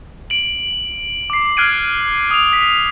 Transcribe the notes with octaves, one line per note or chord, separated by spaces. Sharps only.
D7 F#7
D6 C7
F6 F#6 G#6 C7 D7 D#7
D#6 F7
B6